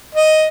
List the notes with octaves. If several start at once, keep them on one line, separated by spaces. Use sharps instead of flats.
D#5